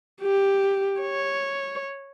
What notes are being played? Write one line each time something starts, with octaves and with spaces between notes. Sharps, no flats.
G4
C#5